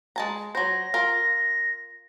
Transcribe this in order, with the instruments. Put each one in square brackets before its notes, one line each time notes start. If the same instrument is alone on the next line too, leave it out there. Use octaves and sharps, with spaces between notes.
[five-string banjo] G#3 A5 A#5
[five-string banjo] F#3 C5 [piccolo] A#6
[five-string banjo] F4 A#4